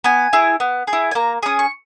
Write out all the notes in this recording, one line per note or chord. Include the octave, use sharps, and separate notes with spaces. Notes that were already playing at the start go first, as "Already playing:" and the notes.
B3 G#5
E4 G#4
B3
G#4
E4
G#5
A#3 A#5
C#4 G#4 D#6
C#6